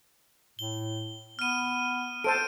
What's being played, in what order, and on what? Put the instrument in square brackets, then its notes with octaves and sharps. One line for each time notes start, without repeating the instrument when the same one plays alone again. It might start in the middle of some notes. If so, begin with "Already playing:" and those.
[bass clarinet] A2 [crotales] G7
[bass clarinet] B3 [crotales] F6 D#7
[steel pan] A4 C5 A5 [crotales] D7 D#7